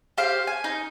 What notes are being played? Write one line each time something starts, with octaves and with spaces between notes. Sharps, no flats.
G4 C5 F5
G#5
D#4